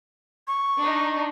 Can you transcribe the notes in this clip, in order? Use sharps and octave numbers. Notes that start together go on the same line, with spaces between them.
C#6
D4 D#4